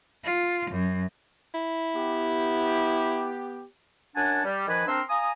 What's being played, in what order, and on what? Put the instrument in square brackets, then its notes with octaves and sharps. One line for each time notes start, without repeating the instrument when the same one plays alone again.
[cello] F4
F#2
[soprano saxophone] E4
[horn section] B3 G4
[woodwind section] F#2 D4 F#5 G#5 A5
G3
D#3 F3 F#4 B4 G#5
C4 D4 A#4 C6 E6
F5 G#5 A#5 D#6